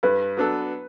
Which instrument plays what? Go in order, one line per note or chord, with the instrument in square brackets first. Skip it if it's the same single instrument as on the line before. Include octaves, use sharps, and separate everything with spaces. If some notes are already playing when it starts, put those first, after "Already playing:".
[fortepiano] G2 [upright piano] B4
[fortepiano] F#3 B3 D4 A4